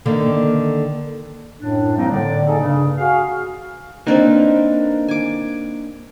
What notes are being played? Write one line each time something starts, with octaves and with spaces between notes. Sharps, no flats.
D3 D#3 A#3
F#2 A2 D4
F3 G3 A#3 C4 D#4
A2 D3 D5
A#3 D#4 G#4 A4
G2 C#3
F#4 G#4 F5
A#3 C4 D4 D#4 A#4 B4
G#5 D6